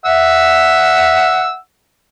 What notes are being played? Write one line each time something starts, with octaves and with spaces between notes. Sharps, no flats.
E5 F#5 E6